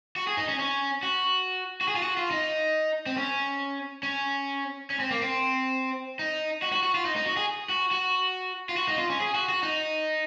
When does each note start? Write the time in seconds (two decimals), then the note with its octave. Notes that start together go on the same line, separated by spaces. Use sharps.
0.16 F#4
0.27 G#4
0.37 D#4
0.49 C#4
0.59 C#4
1.03 F#4
1.81 F#4
1.88 G#4
1.96 F4
2.03 F#4
2.17 F4
2.31 D#4
3.06 C4
3.17 C#4
4.03 C#4
4.90 C#4
5.00 C4
5.11 A#3
5.22 C4
6.19 D#4
6.62 F#4
6.73 F#4
6.83 F#4
6.95 F4
7.05 D#4
7.16 D#4
7.26 F#4
7.37 G#4
7.69 F#4
7.91 F#4
8.69 F4
8.76 F#4
8.88 D#4
8.98 F4
9.10 C#4
9.20 G#4
9.35 F#4
9.49 F#4
9.63 D#4